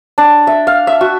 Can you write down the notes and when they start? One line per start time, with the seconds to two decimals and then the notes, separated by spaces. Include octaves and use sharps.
0.18 D4
0.47 E5
0.67 F5
0.87 E5
1.01 F#4